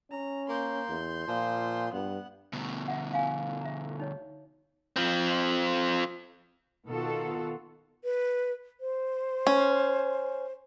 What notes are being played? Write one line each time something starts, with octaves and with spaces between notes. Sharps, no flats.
C#4 A#5
A#3 C6 G6
E2
A#2 F3
G2 B3 F#5
D2 B2
E5 F#5
F5 G#5
E5 A#5
D#4 C#5
F3 C4
B2 D#3 B3 F4 F#4 A4
B4
C5
C#4